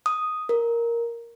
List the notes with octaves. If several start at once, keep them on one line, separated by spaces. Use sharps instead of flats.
D#6
A#4